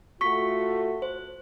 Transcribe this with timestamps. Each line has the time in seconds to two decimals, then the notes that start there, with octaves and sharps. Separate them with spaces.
0.21 A3 F4 F#4 C#6 B6
1.02 C5